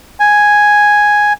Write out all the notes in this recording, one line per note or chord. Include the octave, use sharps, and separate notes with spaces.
G#5